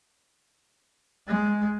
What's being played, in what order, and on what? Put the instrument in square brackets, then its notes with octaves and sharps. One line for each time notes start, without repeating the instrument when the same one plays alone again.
[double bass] G#3